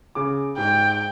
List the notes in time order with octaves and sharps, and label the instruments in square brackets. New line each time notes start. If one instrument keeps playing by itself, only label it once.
[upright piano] C#3 G#4 D6
[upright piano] G#2 G#3 [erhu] G5